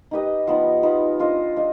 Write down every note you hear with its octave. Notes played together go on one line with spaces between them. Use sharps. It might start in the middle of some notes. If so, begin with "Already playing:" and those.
D#4 G4 B4 D#5
F3 B3 D#4
F3 B3 D#4
D4 F4 C5 D#5
D4 F4 C5 D#5